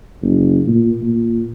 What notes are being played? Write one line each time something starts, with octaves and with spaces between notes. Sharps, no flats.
F#1
A#2
A#2